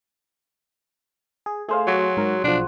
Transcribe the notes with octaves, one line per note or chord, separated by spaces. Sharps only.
G#4
A3 G#4 C5 F5
F#3 F#4
G#2 A#4
B1 F3 D4